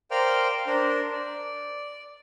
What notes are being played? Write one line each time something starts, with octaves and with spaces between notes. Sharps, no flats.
A#4 C5 D5 F5 G5 F6
D4 A#4 C5
D5